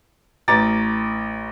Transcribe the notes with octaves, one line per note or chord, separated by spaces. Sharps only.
A1 A#5 D6 A6